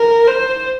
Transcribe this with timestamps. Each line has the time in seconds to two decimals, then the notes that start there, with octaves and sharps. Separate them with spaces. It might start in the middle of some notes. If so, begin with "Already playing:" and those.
Already playing: A#4
0.27 C5